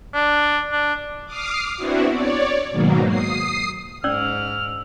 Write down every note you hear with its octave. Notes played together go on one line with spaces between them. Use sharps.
D4
D4
D6 D#6 F6 C7
B3 C4 D4 E4 F#4
C#5 D5
G#2 B2 D#3 F#3 A#3
D#6 C7
G#2 C#4 D5 E6 F6